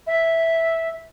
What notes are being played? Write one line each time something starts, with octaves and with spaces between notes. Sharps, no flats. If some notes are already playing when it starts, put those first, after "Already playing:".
E5